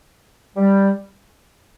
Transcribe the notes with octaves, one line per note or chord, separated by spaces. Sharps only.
G3